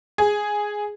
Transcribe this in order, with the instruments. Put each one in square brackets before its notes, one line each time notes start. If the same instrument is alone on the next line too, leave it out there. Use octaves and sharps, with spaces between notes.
[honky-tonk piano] G#4